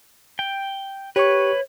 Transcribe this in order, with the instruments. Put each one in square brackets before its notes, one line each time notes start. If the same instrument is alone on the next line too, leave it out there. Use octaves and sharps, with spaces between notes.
[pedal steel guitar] G5
[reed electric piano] G4 C#6 [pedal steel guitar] B4 [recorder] C#5